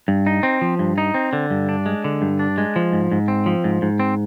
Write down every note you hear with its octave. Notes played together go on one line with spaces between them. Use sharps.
G2
D#4
C4
F3
G2
D#4
C4
D3
G2
D4
G#3
D3
G2
D4
G#3
F3
G#2
G#2
C4
F3
G#2
G#2
C4